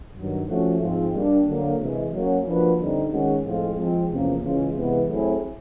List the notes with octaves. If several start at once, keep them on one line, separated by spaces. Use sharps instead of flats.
G2 D#3 F#3
F3 A3 C#4 F#4
G#2 F3 G#3 C4 F4
G3 A#3 D4
D3 F#3 A#3
C3 E3 G#3
F#3 A#3 C#4 F#4
F3 A#3 D4 F#4 B4
D3 G3 C4 D#4
D#3 G#3 C#4 F#4
A2 F3 G#3 C4 F4
F3 G#3 C4
E2 C3 F3 A#3 C#4
C#3 E3 G#3 C#4 F4
C3 E3 G#3 B3
F#3 A3 C4 E4 G#4